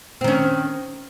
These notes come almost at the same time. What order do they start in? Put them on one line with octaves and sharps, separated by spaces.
C4 D#3 C#4